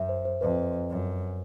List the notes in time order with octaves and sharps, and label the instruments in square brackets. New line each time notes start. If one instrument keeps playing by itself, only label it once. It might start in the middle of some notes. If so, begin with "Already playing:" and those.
Already playing: [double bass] F#2 [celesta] E5
[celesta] C5
C5
[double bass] F2 [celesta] B4
[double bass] F#2